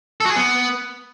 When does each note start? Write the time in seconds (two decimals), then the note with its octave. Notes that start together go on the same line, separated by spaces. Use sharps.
0.20 A4
0.26 F#4
0.31 G#4
0.36 B3